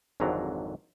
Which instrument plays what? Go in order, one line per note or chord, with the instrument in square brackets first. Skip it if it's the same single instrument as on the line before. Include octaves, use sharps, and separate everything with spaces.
[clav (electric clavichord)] G#1 F2 G#2 D3 F#3 A#5